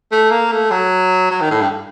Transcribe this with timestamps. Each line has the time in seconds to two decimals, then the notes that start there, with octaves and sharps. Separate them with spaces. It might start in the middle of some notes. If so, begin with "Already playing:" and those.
0.12 A3
0.31 A#3
0.52 A3
0.71 F#3
1.31 F#3
1.41 D#3
1.51 A2
1.61 G2